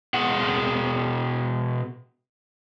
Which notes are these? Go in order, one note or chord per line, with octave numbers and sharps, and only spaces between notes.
B2 G#4 F#5